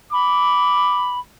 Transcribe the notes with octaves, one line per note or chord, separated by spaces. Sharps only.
B5 D6